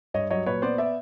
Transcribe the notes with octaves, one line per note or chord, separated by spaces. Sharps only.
G2 C#5 D#5
F#3 C#5 D#5
A#2 B4 C#5
B3 C5 D5
D5 E5